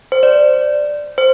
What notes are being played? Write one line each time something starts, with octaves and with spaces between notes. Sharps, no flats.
C5
D5
C5